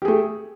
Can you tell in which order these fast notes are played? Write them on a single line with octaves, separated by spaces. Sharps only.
G4 G#4 A3